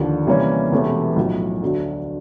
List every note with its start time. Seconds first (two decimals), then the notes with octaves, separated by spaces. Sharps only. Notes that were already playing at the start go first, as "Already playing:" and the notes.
Already playing: D#2 D3 F3
0.26 C3 E3 G3 A#3 C#4
0.72 E1 E2 C3 E3 A3
1.16 B1 A2 F3
1.62 D2 D3 F#3